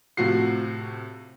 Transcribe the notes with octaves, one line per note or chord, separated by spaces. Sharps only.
A2 C3 F3 F#4 C7